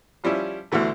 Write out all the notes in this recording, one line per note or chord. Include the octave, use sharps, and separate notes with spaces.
F3 G3 C#4 E4
D2 B2 D3 E3 A3